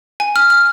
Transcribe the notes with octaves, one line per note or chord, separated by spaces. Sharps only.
G#5
F6
F6